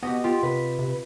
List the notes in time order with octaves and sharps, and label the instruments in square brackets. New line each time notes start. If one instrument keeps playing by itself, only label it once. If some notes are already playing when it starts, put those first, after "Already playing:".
[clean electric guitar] B2 [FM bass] B3 [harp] F#4 G4 D#5
[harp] F4 [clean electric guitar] G4
[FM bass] C3 [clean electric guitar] B4
[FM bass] C3